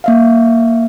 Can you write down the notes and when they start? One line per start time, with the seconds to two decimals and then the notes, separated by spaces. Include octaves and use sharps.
0.04 A#3 E5 F5